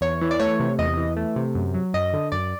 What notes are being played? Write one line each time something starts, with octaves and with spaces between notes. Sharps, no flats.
E2 C#5
E3
D5
A3 C#5
C3
E2 D#5
E3
A3
C3
F#2
F#3
F#2 D#5
D3
F#2 D5